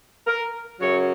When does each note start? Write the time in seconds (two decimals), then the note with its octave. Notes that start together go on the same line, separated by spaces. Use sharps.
0.27 A#4
0.80 F#2 C#3 F#3 C#5